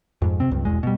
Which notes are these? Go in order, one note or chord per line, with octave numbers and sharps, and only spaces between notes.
F2 G#2
C3 C4
C#2 G2
E1 A#1 E2 G#3
B2 G3